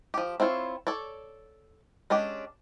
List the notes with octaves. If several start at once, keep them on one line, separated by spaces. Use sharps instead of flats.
F3 G4
C4 E4 F4 C5 C#5
A4 C#5 D5
G#3 C#4 D4 G4